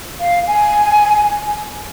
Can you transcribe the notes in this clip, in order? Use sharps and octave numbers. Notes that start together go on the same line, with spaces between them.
F5
G#5